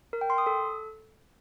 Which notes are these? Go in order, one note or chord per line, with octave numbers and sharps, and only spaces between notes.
A#4
G5
C6
D#6
A4